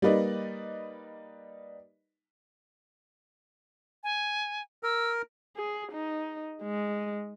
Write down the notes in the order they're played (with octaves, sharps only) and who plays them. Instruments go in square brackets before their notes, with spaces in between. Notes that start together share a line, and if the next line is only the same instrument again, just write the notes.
[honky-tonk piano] G3 A#3 D#4 B4 D5 D#5
[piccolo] G#5
[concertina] A#4 [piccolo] E6
[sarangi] G#4
D#4
G#3